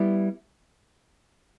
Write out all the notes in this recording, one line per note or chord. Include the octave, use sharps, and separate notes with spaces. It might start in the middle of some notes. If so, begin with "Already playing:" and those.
Already playing: G3 B3 E4